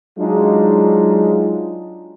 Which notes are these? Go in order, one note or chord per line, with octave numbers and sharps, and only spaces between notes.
F#3 G#3 D4 D#4 F4